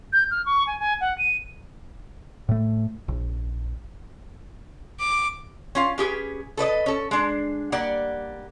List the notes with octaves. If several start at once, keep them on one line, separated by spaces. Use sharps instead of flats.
G6
F6
C#6
G#5
G#5
F#5
D#7
A2 A3
A#1
D6
C#4 F4 F5
C#4 G4 G#4 B4
A4 B4 D5 D#5
C#4 A4
G#3 D4
G3 A#3 D5 F#5